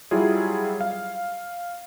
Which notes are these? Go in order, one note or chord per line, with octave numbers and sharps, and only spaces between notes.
F#3 G3 E4 F4 G#4
F5